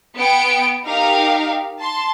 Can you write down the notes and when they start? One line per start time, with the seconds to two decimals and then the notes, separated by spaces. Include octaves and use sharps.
0.16 B3 G5 C#7 D7
0.84 D#4 G4 A#4 F5
1.79 A5 C6